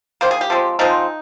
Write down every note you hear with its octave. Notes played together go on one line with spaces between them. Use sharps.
D#3 A#3 C5
G#4
G4
F3 G#3 C4
F3 G#3 C4 D#4